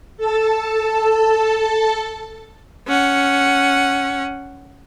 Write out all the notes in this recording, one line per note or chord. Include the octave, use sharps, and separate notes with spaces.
A4 A5
C#4 F#5